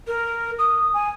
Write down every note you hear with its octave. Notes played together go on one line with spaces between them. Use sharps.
A#4
D#6
G#5